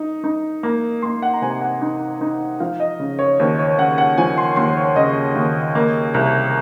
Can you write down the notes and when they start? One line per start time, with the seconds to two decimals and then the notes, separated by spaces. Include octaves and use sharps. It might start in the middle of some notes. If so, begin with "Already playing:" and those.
Already playing: D#4
0.24 D#4
0.63 A#3
1.02 A#3 C6
1.22 F#5
1.33 A#5
1.42 C3 G#5
1.61 F#5
1.82 D#4
2.21 D#4
2.60 F3 F5
2.80 D#5
3.00 C#3
3.19 C#5
3.39 D#2 C5
3.59 C#5
3.78 C#3 F#5
3.98 F#5
4.18 F3 G#5
4.38 C6
4.56 D#2 C6
4.77 C#5
4.96 C#3 D#5
5.35 D#2
5.75 A#3
6.14 C2